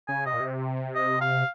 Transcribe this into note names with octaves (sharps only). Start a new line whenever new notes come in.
C#3 G#5
C3 D#5
A#2
C3
D#5
F5